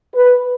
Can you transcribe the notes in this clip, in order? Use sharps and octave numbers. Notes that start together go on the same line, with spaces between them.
B4